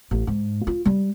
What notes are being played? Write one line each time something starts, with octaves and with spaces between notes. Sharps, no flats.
A1
G#2
F4
G3